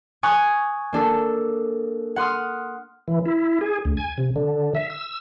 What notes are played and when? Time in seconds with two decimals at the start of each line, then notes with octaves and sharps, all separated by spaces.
0.23 G#5 C#6 D#6 F#6 G#6
0.93 A#3 D4 A4
2.16 F#5 C6 D#6 F6
3.08 E3
3.26 E4
3.61 G#4
3.85 D2
3.97 G#5
4.18 C3
4.36 D3
4.75 E5
4.90 E6